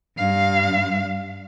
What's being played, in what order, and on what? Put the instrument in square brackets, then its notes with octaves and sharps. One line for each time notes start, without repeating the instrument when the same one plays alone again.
[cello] G2 F5